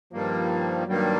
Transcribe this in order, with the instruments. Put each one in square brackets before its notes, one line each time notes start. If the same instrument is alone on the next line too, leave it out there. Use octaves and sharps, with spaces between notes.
[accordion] G2 D#3 G3 A#3 [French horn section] F3
[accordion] G2 D#3 G3 A#3 [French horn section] F#3